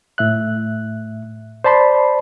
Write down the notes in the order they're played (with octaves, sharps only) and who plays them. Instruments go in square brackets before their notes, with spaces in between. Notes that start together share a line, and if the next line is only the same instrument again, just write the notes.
[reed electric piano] A2 E5 F#6
C5 D5 A5 B5 C6